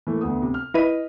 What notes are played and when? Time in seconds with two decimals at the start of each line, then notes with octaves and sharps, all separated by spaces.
0.07 E3 A3 A#3
0.21 D2 B3 D#6
0.42 C3
0.54 F6
0.74 E4 B4 D#5 B6 D#7